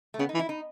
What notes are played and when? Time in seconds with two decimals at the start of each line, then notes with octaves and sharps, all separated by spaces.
0.14 A3
0.19 C#3 B3
0.29 D#4
0.34 E3
0.39 E4
0.49 D#4